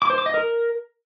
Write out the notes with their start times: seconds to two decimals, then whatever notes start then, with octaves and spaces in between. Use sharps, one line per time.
0.02 D6
0.10 C5
0.18 D6
0.26 D#5
0.34 A#4